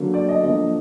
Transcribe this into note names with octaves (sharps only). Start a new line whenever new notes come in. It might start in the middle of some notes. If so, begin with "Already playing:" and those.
Already playing: D3 F#3 A#3
D5
D#5
D3 F3 A#3 D#5